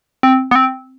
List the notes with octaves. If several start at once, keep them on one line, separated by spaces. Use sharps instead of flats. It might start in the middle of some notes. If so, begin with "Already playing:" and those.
C4
B3
C4